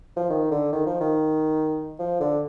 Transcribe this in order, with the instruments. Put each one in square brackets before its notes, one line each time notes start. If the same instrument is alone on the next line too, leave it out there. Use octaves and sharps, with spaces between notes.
[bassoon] F3
D#3
D3
D#3
F3
D#3
F3
D3